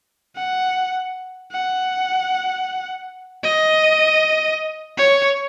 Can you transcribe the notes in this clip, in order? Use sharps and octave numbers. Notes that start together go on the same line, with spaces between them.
F#5
F#5
D#5
C#5